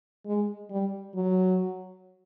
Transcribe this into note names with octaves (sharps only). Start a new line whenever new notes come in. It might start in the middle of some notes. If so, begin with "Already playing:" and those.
G#3
G3
F#3